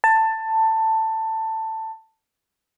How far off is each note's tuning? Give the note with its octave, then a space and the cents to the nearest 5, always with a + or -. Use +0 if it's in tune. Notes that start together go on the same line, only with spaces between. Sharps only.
A5 +15